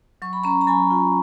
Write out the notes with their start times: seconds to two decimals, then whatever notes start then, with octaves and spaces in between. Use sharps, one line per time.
0.22 F#3 C#6
0.33 B5
0.43 C#4 A#5 C#6
0.61 A#5
0.67 F#3 G#5 B5
0.91 F4